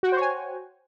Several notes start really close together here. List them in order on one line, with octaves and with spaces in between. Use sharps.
F#4 G5 C5 C#5 G#5